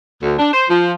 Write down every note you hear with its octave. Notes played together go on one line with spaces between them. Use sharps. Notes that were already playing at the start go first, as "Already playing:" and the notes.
D2
D4
C5
F3